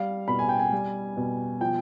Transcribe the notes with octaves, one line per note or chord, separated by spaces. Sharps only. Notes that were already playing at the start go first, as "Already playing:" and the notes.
Already playing: G3 F5
B2 B5
G#5
G5
G#5
G3
B2
F3 G5